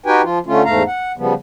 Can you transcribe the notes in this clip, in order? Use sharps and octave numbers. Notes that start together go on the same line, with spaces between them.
D#4 F#4 G4 B4 G5 G#5
F3 F4
D3 A3 C#4 F4
E2 G#2 A3 F5 A#5
F#5
C#3 F3 G3 B3